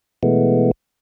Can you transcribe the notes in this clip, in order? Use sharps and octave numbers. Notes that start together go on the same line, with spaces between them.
B2 E3 G#3 A3 B3